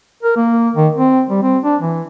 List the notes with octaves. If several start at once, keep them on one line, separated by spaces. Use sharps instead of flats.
A#4
A#3
D#3
C4
G3
C4
D4
E3